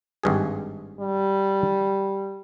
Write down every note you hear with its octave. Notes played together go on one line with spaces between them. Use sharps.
G#1 G2 G#4
G3